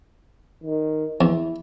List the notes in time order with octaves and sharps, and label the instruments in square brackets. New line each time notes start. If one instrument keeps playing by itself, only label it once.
[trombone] D#3
[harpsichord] E2 [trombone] E4